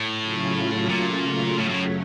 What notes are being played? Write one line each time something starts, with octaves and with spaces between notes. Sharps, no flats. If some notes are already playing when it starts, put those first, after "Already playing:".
Already playing: A2
C#3 F#3 A3 C#4 F4
A#2
F#2 A2 C#3 F#3 A3 C#4
A2